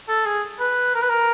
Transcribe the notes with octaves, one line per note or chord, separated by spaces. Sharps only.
A4
G#4
B4
A#4
B4
A#4